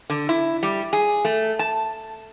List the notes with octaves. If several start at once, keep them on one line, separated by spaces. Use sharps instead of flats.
D3
E4
G3
G#4
A3
A5